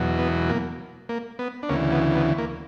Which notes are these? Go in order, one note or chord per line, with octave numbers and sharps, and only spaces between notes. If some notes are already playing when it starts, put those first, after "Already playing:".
Already playing: E2 B2 F#3
B3
A#3
A#3
B3
D4
D2 C#3 E3 A#3 C#4
B3
B3
A#3